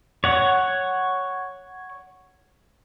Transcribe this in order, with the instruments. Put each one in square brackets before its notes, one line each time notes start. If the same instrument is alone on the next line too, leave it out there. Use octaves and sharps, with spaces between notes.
[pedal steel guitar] C#5 F#5